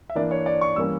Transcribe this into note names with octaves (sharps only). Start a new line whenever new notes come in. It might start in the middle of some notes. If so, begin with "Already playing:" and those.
E5
E3 A#3 D4 D5
C#5
D5
C#6
E3 G3 A#3 C#4 E6